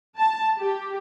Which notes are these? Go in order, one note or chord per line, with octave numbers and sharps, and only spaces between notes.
A5
G4